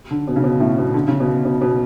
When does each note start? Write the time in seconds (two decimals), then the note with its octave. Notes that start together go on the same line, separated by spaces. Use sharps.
0.11 D3
0.28 B2
0.36 C#3
0.44 B2
0.60 A2
0.78 B2
0.94 D3
1.08 C#3
1.20 B2
1.45 B2
1.61 B2